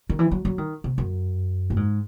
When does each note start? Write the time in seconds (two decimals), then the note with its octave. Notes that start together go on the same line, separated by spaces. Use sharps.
0.09 D#3
0.19 E3
0.31 F#3
0.45 F#3
0.58 D#3
0.84 C3
0.98 F#2
1.70 A2
1.77 G#2